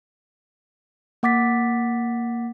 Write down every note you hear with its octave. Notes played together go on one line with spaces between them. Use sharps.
A#3 F#5 D6 A6 B6